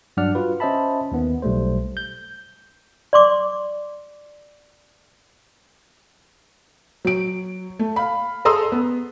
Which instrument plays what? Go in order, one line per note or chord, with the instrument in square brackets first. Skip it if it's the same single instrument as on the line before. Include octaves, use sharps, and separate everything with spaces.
[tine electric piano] G2 F#3 D4 D5 F#5 F6
F4 F#4 B4
C#4 C5 D#5 E5 A5 B5
D#2 D#3 B3
B1 G3 A3 C5
G6
[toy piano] D5 C6 D6
[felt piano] F#3 D7
A3
F5 B5
G#4 A4 A#5 C6 D#6 E6
B3